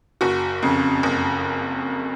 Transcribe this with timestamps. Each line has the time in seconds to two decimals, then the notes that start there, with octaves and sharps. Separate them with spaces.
0.21 F#1 F#4
0.63 F2 C#3
1.03 F#1